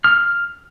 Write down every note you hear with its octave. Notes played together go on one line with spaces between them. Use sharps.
F6